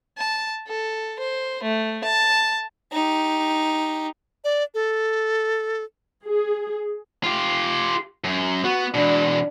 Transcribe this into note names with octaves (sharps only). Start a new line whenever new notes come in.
A5
A4
C5
A3
A5
D#4 G4
D5
A4
G#4
F4 G4
F#2
B3 F#4
E2 B2 D4